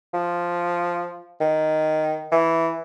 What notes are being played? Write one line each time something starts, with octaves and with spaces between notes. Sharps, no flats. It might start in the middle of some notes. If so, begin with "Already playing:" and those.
F3
D#3
E3